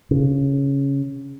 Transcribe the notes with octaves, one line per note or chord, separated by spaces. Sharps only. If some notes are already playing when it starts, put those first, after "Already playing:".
C#3